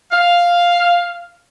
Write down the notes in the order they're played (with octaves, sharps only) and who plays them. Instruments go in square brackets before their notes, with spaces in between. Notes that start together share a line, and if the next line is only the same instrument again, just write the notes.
[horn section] F5